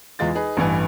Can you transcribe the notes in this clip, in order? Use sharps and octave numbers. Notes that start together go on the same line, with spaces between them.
E2 E3 G#3 F4 A6
D#4 G#4 B4
A1 G2 E3 G#5